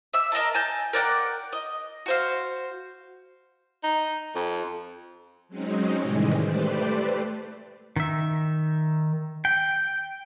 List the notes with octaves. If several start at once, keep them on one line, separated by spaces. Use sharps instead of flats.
E5 E6
A#4 D#5 E5 A5
G#5 A5 G6
A#4 D5 F#5 G5
D#5
F#4 C5 F5
D#4
F2
F#3 G#3 C4 C#4 D#4
A2 C3 D#3 E3 G3 G#3
A3 G4 B4 C5 D5
D#3 E5
G5